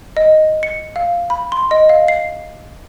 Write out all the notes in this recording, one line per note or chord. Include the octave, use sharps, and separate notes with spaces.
D#5
C#7
F5
B5
C6
D#5
F5
C7